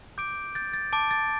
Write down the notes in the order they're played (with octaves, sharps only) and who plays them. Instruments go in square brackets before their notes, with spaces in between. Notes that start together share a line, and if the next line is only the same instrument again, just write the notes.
[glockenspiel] D6 G6 D7
G6 A6
A6
A5 D6 D7
A6